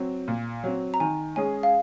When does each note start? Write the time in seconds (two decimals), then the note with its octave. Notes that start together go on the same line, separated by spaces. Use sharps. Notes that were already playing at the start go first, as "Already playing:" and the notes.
Already playing: F#3 C4
0.28 A#2
0.64 F#3 C4
0.94 A#5
1.00 D#3 G#5
1.36 G#3 C#4 G#4 G#5
1.63 F5